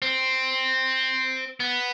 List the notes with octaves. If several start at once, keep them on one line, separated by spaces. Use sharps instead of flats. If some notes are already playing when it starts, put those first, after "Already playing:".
C4
B3